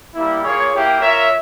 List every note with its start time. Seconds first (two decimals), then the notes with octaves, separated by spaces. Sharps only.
0.15 G3 A#3 E4
0.43 A#3 F4 G#4 C#5
0.73 A#3 E4 G4
1.00 F4 A#4 C#5 E5